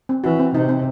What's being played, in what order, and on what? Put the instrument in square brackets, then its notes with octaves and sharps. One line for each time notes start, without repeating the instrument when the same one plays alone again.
[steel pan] C4
[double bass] E3 [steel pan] F#4
[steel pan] C4
[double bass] C3 [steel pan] D#4
[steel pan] C4